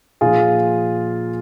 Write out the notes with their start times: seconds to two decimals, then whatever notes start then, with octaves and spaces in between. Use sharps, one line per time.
0.21 A#2 F3 F4 G#4